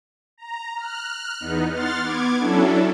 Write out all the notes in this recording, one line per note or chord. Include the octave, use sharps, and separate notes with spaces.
A#5
F6 F#6
E2 B3 D#4
F#5 C6 F6 A6
B3 D6 G#6
F#3 C#4 D4 E4 A4